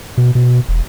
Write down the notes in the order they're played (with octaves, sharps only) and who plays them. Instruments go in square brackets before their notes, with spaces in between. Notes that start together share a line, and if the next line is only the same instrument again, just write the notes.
[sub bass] B2
B2
E1